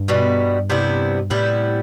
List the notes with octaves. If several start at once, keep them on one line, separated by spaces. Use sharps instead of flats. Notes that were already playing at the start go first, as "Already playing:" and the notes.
Already playing: G2
B2 G3 B3
C3 G3 B3 E4
A2 C3 G3 B3 E4